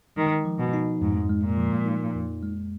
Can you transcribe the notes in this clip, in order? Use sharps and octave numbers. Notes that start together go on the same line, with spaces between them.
D#3 G#3
F3
B2
D#4
F2 G#2
G#3
A#2
F3
D#4
F2
G#3